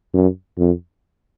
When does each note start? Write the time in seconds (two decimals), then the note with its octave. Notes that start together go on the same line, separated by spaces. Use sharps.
0.14 F#2
0.58 F2